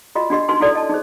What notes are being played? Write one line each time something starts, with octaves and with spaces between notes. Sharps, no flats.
F4 F#4 D#5
D4 F#4 G4 D#5
D4 D#4 F#4 B4 G#5 C6
D#4 E4 F#4 A4 D5
D#5 A5
D#4 G#4 C5